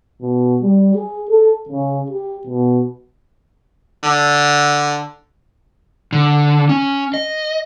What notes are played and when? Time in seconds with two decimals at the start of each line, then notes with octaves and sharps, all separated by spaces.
0.21 B2
0.62 G3
0.95 G#4
1.30 A4
1.69 C#3
2.10 G4
2.47 B2
4.03 D3
6.13 D3
6.69 C#4
7.14 D#5